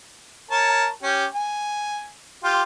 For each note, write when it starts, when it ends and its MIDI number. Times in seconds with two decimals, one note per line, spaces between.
0.51 0.87 70
0.51 0.87 73
0.51 0.87 81
1.03 1.25 61
1.03 1.25 67
1.35 2.07 80
2.44 2.63 65
2.44 2.63 67